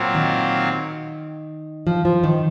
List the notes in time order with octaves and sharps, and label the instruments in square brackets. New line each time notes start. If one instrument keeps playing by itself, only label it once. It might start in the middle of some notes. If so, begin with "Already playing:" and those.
Already playing: [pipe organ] A#2 F#3 C4 F4
[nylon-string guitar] D#3
F3
F3
D#3